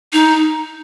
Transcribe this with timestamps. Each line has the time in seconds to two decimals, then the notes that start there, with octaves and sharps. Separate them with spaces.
0.13 D#4